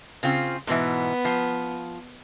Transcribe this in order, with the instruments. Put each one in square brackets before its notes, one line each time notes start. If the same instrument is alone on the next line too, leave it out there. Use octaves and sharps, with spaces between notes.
[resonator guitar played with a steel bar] C#3 C4 F4
[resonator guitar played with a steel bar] G#2 B2 E3 [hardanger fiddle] B3
[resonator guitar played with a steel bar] F3